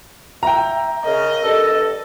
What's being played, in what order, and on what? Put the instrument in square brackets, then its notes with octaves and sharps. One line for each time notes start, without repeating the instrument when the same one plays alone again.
[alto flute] E5 [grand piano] G5 A#5
[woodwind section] C#3 [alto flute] A#4 [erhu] D#5
[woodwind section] G2 A4